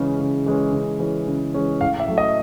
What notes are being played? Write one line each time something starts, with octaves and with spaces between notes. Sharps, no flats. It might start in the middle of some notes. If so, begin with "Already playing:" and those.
Already playing: C#3 E3 G#3 C#4
C#3
E3 G#3 C#4
C#3
E3 G#3 C#4
C#3
E3 G#3 C#4
A2 F5
E5
F#3 A3
D#5